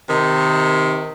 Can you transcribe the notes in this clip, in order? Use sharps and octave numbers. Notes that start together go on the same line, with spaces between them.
C3 D#3